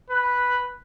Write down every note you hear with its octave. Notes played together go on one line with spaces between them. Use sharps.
B4